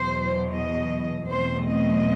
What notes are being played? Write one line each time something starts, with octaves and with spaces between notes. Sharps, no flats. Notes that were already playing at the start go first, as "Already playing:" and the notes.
Already playing: E2 B2 F#3 C5
D#5
E2 B2 F#3 A3 C4 C5
D#5